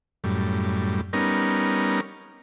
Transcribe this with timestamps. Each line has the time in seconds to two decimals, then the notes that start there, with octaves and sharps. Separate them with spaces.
0.24 F#2 A2 G3
1.13 G3 B3 C#4 D#4 A#4